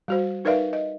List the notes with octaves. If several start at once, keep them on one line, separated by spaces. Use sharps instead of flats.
G3 F#4 C5
D#4 A#4 B4 D5 E5 F5
D#5